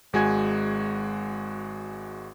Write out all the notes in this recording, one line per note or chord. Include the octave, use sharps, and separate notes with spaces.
G#1 G#3 F#4 G#5 G#6